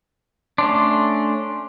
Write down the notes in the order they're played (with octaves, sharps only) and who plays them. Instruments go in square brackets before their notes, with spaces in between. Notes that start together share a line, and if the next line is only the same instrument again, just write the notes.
[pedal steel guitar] A3 C#4 D4 [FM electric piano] C6